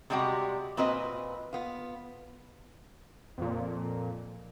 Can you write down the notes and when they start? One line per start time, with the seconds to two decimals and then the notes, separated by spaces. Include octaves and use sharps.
0.10 C3 G3 G#3 F#4 G4
0.77 A#2 C4 F#4 B4 D#5
1.53 B3 F4
3.38 F2 A#2